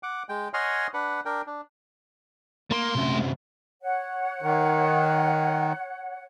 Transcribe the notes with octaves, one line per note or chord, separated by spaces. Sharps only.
F#5 D6
G#3 G5
C#5 D#5 F#5 G#5 C6 F6
D4 B4 F#5
D4 A#4 G5
D4
A3 A#3 C6
C2 F#2
C#5 F#5
D#3